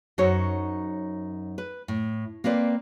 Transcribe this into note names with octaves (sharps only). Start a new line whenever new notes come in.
F#2 D#4 F#4 C5 C#5
B4
A2
A#3 C4 B4 D5